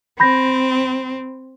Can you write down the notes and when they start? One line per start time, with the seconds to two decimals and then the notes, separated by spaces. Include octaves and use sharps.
0.20 C4 B5 G6 A#6